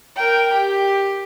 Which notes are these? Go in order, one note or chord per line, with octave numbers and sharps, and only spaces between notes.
A#4 G5
G4